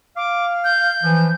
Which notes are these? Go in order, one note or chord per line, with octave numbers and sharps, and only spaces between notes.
F5 D6
G6
E3 F3